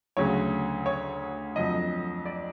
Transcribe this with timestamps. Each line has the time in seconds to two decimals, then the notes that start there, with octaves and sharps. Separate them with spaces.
0.17 D2 C#3 F#3 C#5
0.86 C#5
1.56 F2 D3 F#3 D#5
2.25 D5